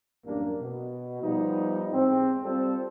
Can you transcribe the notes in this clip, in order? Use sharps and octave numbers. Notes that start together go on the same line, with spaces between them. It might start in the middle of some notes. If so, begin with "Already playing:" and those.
A1 F#2 G3 A#3 D4
B2
F3 G3 B3 D#4
E2 G#2 C4
G3 C4 F4 A4 C5